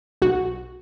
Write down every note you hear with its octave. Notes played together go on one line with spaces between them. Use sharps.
B1 F#4